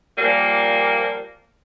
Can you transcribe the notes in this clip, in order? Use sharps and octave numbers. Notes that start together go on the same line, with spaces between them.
A#2 F3 G3 A#3